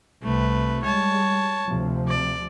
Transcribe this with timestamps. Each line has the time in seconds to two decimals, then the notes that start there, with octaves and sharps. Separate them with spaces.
0.23 C2 C3 A3 B4
0.84 G3 G#3 C#5 A5
1.67 D2 C3 F3
2.08 D5